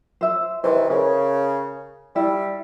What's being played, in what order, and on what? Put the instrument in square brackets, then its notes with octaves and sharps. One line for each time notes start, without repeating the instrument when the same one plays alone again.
[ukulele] C5 E5
[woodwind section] C3 D#3 E3 [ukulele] C5
[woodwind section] C#3 [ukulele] A#4
[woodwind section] G3 [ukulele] E4